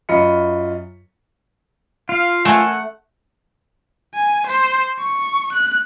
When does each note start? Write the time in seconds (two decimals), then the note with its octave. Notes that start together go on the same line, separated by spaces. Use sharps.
0.09 F#2 F4 D#5 B5 C#7
2.09 F4 F5
2.45 A3 A4 A#4 F#5 G#5
4.15 G#5
4.47 C5
4.99 C#6
5.53 F#6